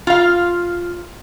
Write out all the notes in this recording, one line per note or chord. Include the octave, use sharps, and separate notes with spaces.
F4 F5